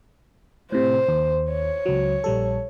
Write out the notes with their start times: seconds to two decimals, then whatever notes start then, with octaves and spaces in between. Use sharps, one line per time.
0.72 A2 C3 C5
1.08 D#2
1.51 C#5
1.86 C#2 F#3
2.24 A#1 G3 A4